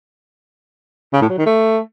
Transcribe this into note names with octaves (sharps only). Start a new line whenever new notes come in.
C#3
A2
F#3
D#3
A3